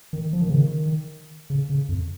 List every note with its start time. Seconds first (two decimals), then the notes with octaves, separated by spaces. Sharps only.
0.13 D#3
0.33 F3
0.41 D#3
0.49 C#3
0.58 D#3
1.50 C#3
1.70 C#3
1.89 F2